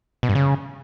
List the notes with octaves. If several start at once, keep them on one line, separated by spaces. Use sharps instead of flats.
B2
G2
C#3